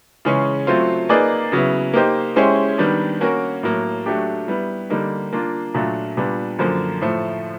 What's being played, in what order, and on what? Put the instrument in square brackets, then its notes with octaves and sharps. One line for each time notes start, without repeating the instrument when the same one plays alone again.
[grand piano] C#3 E3 G#3 C#4
F#3 A3 C4 F4
A#3 D#4 G#4 B4 D5
C#3 F#3 B3 E4
A#3 D#4 G4 C5 D#5
G#3 C#4 E4 G4 C5
D#3 G3 B3 D4
A#3 C#4 F#4 A#4
A2 F#3 A#3
F#3 A3 D4 G4
G3 B3 E4
D3 G3 A#3 D#4
A#3 D4 F4
A#2 F#3 A3 D4 F4
A#2 G3 B3 D4
F#2 D3 F3 A#3
A2 F3 A3